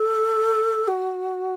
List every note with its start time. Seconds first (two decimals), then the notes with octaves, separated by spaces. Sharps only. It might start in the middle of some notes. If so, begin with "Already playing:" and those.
Already playing: A4
0.87 F#4